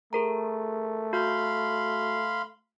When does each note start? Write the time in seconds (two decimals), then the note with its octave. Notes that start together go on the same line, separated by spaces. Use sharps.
0.13 A3 G#4 A#4 A#5
1.13 F#4 F5 B5 C6